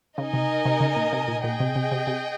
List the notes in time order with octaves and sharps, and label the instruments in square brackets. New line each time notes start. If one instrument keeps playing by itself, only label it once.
[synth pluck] C#3 [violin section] D#4 A#4 D#5 G#5
[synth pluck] C3
C3
C#3
A#2
C3
A#2
[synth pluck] A#2 [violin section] G#4 D#5 G5
[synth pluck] C3
C3
C3
C3